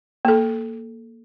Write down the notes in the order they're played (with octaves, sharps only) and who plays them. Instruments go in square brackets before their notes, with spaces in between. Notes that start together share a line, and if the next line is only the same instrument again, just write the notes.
[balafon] A#3 A4